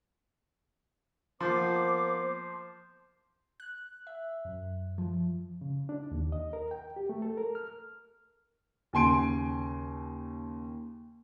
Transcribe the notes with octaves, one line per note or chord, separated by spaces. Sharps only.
F3 A#3 B3 C5 C6 D6 G6 C7
F#6
E5
F#2
F3
C#3
D4
D#2
D#5
A#4
G5
G4
A3
A4
A#4
F6
D#2 C#3 G#5 C6 D7